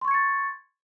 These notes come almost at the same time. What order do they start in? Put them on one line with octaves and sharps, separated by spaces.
C6 C#6 G#6 C#7 A6